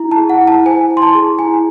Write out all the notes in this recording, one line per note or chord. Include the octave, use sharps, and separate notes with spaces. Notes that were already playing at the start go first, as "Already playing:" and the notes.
Already playing: E4
A5
G#4
F#5
E4
A5
C5 G#5
E4
C6
A5
G#4
E4 G#5